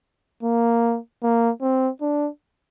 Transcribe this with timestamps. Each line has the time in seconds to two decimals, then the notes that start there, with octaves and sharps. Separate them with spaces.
0.43 A#3
1.23 A#3
1.62 C4
2.01 D4